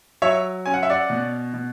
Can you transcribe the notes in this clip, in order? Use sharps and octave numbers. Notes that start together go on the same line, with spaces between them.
F#3 C#5 E5
C#4 G#5
F#5
E5
D5 F#5
B2
B2